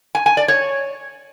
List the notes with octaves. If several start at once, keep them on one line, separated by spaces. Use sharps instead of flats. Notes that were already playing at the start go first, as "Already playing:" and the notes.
G#5
G#5
D5
C#5